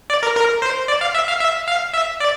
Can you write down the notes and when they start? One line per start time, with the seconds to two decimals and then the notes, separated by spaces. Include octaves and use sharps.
0.10 D5
0.23 A#4
0.36 A#4
0.62 C5
0.88 D5
1.01 F5
1.15 E5
1.28 F5
1.40 E5
1.68 F5
1.93 E5
2.20 D5